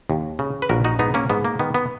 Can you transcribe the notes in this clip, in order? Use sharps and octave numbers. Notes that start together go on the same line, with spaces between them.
D#2
C#3
B4
A#1 F#4 A#4
D#4 F#4
G#2 B3 D#4
A#3 C#4
G#2 B3
A#3
D#3 B3
B3